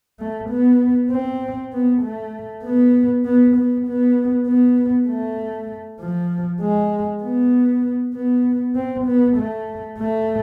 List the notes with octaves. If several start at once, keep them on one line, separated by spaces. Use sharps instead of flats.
A3
B3
C4
B3
A3
B3
B3
B3
B3
B3
A3
F3
G#3
B3
B3
C4
B3
A3
A3